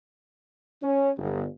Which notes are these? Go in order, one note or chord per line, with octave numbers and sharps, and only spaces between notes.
C#4
G1